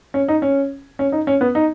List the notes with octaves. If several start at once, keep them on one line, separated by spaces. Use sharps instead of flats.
C#4
D#4
C#4
C#4
D#4
C#4
B3
D#4